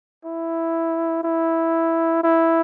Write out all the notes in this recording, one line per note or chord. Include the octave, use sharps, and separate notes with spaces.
E4
E4
E4